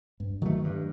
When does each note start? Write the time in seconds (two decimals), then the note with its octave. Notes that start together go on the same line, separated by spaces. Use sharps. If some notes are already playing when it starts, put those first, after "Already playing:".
0.20 G2
0.42 D#3 F#3 A3
0.64 G2